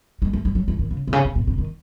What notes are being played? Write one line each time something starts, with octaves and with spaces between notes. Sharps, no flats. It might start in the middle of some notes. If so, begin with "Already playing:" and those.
G#3
A3
G3
F#3
E3
D#3
C#3
C3
C#3
C3
B2
C3
D#3